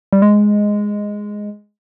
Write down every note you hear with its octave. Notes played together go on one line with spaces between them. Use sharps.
G3
G#3